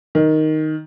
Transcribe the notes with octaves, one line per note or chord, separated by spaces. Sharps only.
D#3